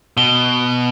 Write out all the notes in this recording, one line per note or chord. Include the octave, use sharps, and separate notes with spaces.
B2 G7